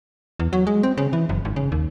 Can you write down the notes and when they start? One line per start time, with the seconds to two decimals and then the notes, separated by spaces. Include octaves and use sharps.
0.39 E2
0.53 F#3
0.67 G#3
0.83 C4
0.97 C#3
1.13 E3
1.29 F#1
1.45 G#1
1.56 C#3
1.72 D#2